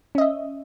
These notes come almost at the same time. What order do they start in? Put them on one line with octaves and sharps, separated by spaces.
C#4 D#5 E5